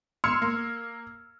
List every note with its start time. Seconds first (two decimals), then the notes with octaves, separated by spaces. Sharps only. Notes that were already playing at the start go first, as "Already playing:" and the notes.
0.24 C6 E6 F6 G#6 C#7
0.42 A#3